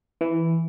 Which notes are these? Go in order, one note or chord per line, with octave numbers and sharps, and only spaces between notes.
E3